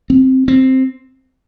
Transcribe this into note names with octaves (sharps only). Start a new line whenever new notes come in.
C4
C4